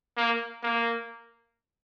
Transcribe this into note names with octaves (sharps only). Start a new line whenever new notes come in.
A#3
A#3